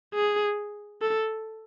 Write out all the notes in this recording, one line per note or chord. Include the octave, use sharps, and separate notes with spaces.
G#4
A4